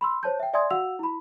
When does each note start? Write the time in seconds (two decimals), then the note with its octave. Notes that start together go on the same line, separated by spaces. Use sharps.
0.01 B5 C6 E6
0.23 C5 C#5 A5 G6
0.40 E5 G5
0.53 D5 E5 G#5 C6 D#6 G#6
0.71 F#4 F5 F#5 E6 F7
0.99 E4 B5